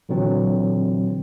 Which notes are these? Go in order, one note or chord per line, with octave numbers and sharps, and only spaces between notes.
A#2 D3 E3 F#3 C4